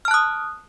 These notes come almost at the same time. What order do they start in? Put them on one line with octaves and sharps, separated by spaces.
F6 A5 F#6 D#6